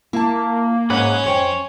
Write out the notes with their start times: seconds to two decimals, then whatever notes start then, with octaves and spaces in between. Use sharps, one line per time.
0.13 A#3 E4 A5
0.90 G#2 C#4 G#4 B4 F#5
1.24 F2 C5 C#5 G5